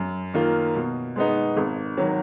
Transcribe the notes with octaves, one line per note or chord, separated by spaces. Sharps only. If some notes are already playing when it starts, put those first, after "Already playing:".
Already playing: F#2
D#3 A#3 F4 A#4
B2
G#3 B3 D#4
G#1
D#3 F#3